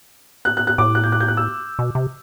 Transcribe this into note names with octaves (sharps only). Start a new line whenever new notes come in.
F#6
F#6
F#6
A2 D6
F#6
G6
F#6
G6
F#6
E6
B2
C3